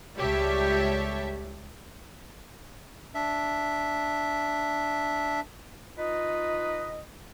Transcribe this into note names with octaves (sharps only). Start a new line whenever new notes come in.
C#2 G3 G4 A4 C#5 E5
D4 E5
D#4 F4 B4 D#5